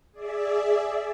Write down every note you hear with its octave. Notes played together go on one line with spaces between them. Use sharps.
G#4 D5 E5